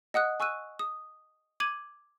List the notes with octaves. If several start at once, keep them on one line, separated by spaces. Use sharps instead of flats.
D#5 F#5 D#6 F#6
G#5 C#6 E6 F#6 D#7
D#6
D6 G#6 D#7 F#7